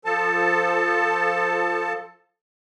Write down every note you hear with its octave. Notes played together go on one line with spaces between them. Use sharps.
F3 A4 A5